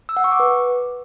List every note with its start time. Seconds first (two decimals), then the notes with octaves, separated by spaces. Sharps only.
0.09 E6
0.17 F#5
0.24 C#6
0.32 D6
0.40 B4